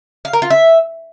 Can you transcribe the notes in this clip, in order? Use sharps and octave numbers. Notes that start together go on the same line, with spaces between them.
F5
A#4
F4
E5